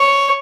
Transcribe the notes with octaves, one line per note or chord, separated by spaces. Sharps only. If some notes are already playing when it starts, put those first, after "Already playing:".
Already playing: C#5